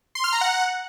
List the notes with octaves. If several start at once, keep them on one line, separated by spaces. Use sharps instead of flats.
C6
F6
A#5
F#5